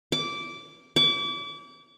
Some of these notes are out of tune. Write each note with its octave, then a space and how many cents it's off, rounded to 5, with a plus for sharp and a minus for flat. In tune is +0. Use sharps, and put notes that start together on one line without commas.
D6 -15
D6 -35